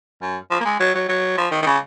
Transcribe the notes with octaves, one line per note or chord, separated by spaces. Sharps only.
F#2
F3
A#3
G#3
F#3
F#3
F#3
F3
D#3
D#3
C#3